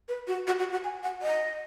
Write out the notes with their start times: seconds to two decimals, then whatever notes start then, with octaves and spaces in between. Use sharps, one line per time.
0.08 B4
0.27 F#4
0.47 F#4
0.59 F#4
0.72 F#4
0.84 G#5
1.03 F#5
1.22 D#5